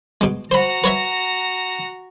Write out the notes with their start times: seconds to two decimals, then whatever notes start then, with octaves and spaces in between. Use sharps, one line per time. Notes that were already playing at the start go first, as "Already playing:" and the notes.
0.21 B2 G#3
0.51 F#4 C5 A#5 B5
0.84 B4 C#5 E5